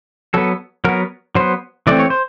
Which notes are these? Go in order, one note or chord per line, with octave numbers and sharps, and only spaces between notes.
F#3 B3 A4
F#3 B3 A#4
F#3 B3 C5
E3 A3 C4 D5
C#5
C5